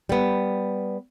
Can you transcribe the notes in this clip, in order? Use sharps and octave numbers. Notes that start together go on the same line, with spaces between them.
G3 B3